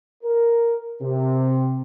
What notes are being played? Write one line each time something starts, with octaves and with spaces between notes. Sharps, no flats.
A#4
C3